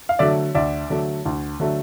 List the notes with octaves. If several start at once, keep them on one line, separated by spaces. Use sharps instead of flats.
F5
D3 F#3 A3 D5 E5
D2 D5 E5
D3 F#3 A3
D2
D3 F#3 A3